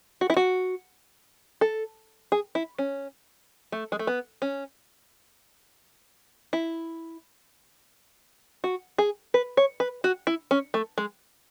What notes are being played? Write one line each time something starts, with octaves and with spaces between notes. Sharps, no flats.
F#4
E4
F#4
A4
G#4
E4
C#4
A3
G#3
A3
B3
C#4
E4
F#4
G#4
B4
C#5
B4
F#4
E4
C#4
A3
G#3